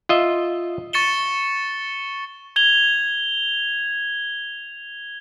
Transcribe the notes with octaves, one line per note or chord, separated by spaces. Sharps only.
F4 D#5 E5
C#6 A6 C#7 E7 G7
G#6 F7 G7